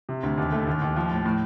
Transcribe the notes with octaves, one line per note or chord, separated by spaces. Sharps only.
C3
D2
D#2
A3
D#2
D#2
F3
A2
A2